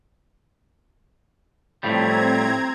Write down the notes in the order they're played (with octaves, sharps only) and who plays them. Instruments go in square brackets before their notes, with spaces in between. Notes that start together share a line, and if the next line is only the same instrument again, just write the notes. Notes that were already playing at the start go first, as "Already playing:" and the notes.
[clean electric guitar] A2 F3 G3 [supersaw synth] C4 A#5 G#6